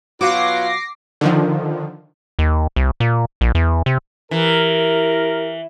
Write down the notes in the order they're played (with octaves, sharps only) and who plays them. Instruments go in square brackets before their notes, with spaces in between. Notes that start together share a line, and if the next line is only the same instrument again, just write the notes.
[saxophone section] B2 F#3 [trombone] F4 [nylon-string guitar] F#4 [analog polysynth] D6 A#6 C7
[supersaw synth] D3 D#3 F3
[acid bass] D#2
C2
A#2
A#1
E2
C3
[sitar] E3 [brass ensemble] E4 G4 A#4